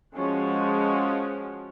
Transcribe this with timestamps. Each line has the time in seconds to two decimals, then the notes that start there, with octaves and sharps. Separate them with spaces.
0.15 F3 G#3 C#4 F#4